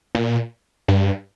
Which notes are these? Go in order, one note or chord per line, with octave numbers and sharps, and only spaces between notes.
A#2
G2